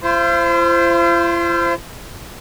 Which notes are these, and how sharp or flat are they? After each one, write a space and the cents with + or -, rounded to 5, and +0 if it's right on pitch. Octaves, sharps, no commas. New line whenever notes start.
F4 -45 C5 +0